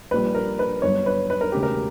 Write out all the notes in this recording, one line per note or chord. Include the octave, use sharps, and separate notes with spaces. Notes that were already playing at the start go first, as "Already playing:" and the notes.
A#1 A#2 G3 B4
A#4
B4
G1 G2 F#3 C#5
B4
B4
A#4
E1 D2 C#3 G4
A#4